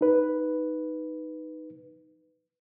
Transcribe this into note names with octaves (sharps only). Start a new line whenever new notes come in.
D#4 B4